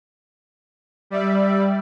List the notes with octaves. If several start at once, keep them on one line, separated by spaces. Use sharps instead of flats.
G3 D5 E5